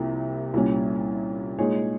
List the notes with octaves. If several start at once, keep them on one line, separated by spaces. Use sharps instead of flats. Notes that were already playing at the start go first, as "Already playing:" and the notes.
Already playing: C2 C3 F3 A#3
C2 A#2 G3 C#4
A#2 G#3 D#4 G#4 C#5